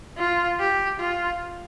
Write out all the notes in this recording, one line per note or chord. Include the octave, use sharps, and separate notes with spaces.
F4
G4
F4